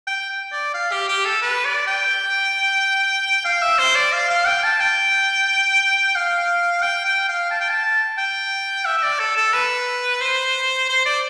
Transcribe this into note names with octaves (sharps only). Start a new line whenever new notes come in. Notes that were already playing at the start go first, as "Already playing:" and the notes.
G5
D5
F5
G4
G4
A4
B4
D5
G5
F5
E5
C5
D5
F5
F5
G5
A5
G5
F5
G5
G5
F5
A5
G5
A5
G5
E5
E5
D5
A4
A4
B4
C5
C5
D5